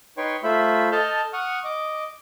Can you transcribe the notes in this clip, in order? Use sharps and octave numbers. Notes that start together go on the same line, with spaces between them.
D#4 B4 C#5 G5 C6 C#6
A3 F4 C5 E5 B5
A4 D#5 A5 F6 G6
F#5 C#6 D#6 F6
D#5 D6